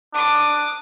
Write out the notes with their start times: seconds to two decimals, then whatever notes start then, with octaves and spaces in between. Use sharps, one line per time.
0.14 D4 D6 D#6